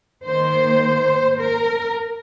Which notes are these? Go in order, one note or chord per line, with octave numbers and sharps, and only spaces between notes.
D#3 A#3 C5
A#4